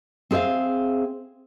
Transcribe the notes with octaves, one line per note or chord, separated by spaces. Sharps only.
C4 G#4 C5 E5 F5